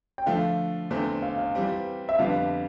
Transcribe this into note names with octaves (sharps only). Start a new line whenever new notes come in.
G5
D3 F3 A3 F5
E2 D3 A3 C4
F5
F5
E3 G3 C4 G4
E5
F2 D3 G3 B3 F5